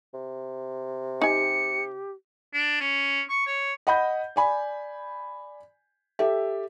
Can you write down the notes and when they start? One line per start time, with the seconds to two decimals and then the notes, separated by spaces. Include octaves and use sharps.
0.13 C3
1.22 D#4 G4 G#5 C#7
2.54 D4
2.80 C#4
3.29 C#6
3.47 C#5
3.87 D#5 F#5 B5 G6
4.36 D5 G#5 B5
6.19 G4 A4 E5